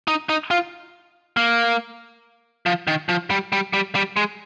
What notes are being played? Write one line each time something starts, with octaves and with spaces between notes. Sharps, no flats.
D#4
D#4
F4
A#3
F3
D#3
F3
G3
G3
G3
G3
G#3